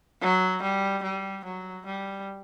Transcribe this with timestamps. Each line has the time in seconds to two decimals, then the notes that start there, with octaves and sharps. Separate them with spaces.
0.22 F#3
0.62 G3
1.03 G3
1.45 F#3
1.86 G3